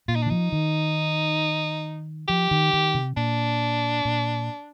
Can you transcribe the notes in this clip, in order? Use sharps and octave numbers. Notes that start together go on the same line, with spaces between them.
A#2 F4
D#4
D4
D#3
F3 D#4
D#3
F3 G4
D#3
D#3
C3
A#2 D4
A#2